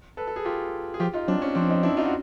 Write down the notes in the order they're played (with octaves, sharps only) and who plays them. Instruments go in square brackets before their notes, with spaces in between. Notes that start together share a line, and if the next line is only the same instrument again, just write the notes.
[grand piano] A4 B4
A4
G#4
F4 G4
G#4
[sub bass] F3 [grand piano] F4 G4
[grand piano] D#4 F4
[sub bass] F#3 [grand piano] C4 D4
[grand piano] C#4
[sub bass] F3 [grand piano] C4 D4
[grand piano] C#4 D#4
D4 E4
D#4 F4
F#4